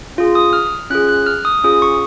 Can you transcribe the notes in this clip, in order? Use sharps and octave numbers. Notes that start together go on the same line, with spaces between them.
C#4 F4 G#4
D#6
F6
C#4 F4 G#4 F#6
F#6
F6
D#6
C#4 F4 G#4 D#6
C#6